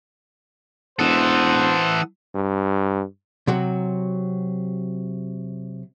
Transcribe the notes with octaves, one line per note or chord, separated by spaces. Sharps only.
E1 E3 A4 C5 F#5 D#6 E6
G2
C3 F#3 F#4